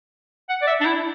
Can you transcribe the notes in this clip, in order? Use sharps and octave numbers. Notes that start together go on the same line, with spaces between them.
F#5
D5
E5
D4
E4